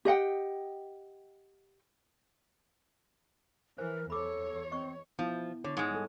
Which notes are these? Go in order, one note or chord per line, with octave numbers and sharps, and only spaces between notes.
G4 D#5 F#5 G5
E3 A#4 C5 G#5
E2 A4 C#5 B5 D6
C4 D#5 C#6
F3 B3 E4
D3 C#5
G#2 G#3
G3 A4